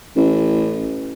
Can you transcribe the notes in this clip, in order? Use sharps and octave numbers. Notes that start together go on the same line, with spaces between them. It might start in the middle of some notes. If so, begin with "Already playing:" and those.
A1